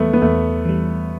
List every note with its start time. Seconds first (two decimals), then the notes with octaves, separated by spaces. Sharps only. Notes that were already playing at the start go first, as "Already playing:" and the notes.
Already playing: E2 E3 G3 A3 B3
0.13 B3
0.22 E2 A3
0.65 E3 G3